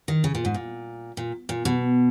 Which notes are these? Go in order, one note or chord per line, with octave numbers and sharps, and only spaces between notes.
D#3
C#3
A#2
G#2
A#2
A#2
A#2
B2